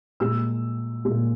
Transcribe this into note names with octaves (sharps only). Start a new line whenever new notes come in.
A#2 G#3 E6
A#2 G#3